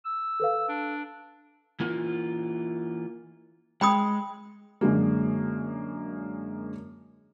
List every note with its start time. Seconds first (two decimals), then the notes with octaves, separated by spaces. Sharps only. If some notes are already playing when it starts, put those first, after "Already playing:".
0.05 E6
0.40 A4 B4 F5
0.68 D4
1.80 E3 A#3 F4
3.81 G#3 G5 B5 D#6
4.81 F#2 D3 G#3 A#3